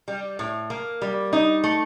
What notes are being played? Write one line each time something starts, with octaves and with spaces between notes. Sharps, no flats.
G3
A2
A#3
G3
D#4
A3